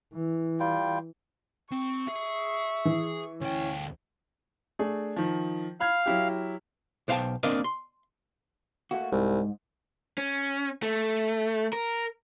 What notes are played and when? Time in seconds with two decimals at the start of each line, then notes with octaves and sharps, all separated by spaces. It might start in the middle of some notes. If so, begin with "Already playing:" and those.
0.13 E3
0.60 G3 F4 G5
1.72 C4 C#6
2.08 G#4 E5
2.85 E3
3.41 D2 C#4 G5
4.79 A3 D4 G#4
5.16 D#3 F3
5.80 F5 B5 F6 G#6
6.06 F#3 E4 G4
7.08 B1 C5 F5 G5 A5
7.43 A#3 C4 D4 A#4 D#5 F5
7.64 C6
8.91 A3 A#3 F#4
9.12 C2 G#2
10.18 C#4
10.82 A3
11.73 A#4